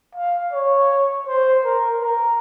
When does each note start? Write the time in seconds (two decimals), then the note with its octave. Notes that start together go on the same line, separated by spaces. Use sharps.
0.15 F5
0.53 C#5
1.27 C5
1.64 A#4
2.02 A#4